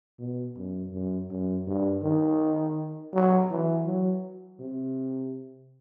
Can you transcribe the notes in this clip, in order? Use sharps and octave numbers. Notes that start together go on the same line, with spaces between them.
B2
F#2
F#2
F#2
G2
D#3
F#3
E3
F#3
C3